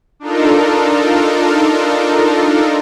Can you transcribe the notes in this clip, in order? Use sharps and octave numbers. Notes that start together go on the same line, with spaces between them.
D4 D#4 F4 A4 A#4